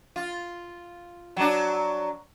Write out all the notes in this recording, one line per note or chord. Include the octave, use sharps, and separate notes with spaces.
F4
F#3 D4